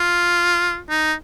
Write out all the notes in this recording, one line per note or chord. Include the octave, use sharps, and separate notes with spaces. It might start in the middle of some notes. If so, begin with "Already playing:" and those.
Already playing: F4
D#4